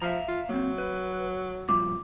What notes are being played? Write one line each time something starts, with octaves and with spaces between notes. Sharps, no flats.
F3 E5 F5 A#5
F4
F#3 A#3 C4
B4
A#2 F3 G3 D6